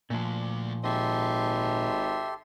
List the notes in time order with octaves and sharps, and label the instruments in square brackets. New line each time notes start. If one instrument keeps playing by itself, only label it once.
[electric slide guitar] A#2 F3 [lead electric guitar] A3 D4
[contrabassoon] G#1 [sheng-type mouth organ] G4 A4 C6 [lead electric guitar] D#5 E5